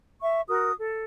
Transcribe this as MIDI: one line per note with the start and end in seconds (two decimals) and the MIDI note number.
0.21 0.40 76
0.21 0.40 85
0.48 0.72 66
0.48 0.72 70
0.48 0.72 87
0.78 1.04 69